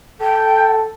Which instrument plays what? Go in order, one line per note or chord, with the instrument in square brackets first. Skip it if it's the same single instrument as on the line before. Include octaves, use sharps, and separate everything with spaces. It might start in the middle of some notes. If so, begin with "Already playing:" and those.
[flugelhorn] A4 [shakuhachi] G5